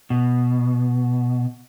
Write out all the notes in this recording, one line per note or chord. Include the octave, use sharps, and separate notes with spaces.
B2